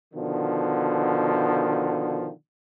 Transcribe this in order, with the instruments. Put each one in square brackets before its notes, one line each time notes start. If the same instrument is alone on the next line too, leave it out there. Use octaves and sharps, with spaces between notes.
[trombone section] B2 D3 D#3 F3